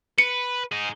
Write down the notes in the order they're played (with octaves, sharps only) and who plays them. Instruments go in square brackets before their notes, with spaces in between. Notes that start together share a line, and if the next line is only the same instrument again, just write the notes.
[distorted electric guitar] B4 [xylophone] C#7
[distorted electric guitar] D#4 G#4